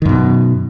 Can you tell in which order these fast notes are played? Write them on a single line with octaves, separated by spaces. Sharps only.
D#3 F#2 B2